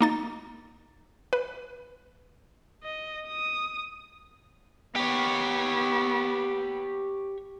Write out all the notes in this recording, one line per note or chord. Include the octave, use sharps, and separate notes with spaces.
A#3 D#4 A6
B4
D#5
D#6
B3 G4 C#5